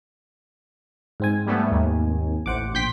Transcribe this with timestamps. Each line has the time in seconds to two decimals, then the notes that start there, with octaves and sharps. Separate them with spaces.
1.20 G#2 C4 G#5
1.46 G3 A3 B3
1.71 D#2
2.46 A1 C5 F#5 D6
2.74 A#1 G5 C6 G6 B6